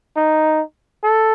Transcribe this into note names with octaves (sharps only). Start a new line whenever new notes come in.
D#4
A4